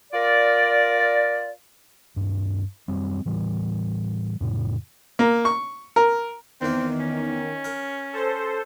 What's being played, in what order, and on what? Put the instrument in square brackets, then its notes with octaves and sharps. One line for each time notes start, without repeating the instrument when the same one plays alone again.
[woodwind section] F4 A#4 D5
[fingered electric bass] D1 G2
F#2 F#3 G3 C4
A2 E3 G3
F2 A2 C#3
[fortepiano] A#3
C#6
A#4
[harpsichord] E2 A#3 [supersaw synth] D#3 [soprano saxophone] C4
[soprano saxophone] C#4
[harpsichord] A#4
[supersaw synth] A4 C5